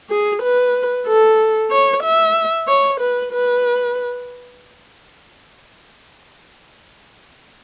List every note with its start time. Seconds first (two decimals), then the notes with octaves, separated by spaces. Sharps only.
0.10 G#4
0.43 B4
1.07 A4
1.71 C#5
2.03 E5
2.68 C#5
3.00 B4
3.32 B4